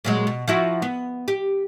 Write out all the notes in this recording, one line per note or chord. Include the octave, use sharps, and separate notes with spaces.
A#2 F#3 G#3
B2
F3 E4 F#4
B3
G4